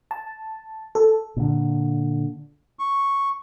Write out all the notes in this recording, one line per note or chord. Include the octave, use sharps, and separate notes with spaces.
A5
A4
A#2 D3
C#6